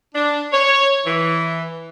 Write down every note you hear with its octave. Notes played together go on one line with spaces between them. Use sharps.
D4
C#5
E3